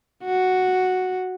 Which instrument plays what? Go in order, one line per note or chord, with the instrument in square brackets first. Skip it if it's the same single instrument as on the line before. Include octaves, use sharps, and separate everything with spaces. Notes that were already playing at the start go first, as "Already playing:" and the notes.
[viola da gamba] F#4